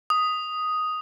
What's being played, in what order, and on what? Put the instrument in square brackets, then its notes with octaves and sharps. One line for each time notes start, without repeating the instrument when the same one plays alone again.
[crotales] D#6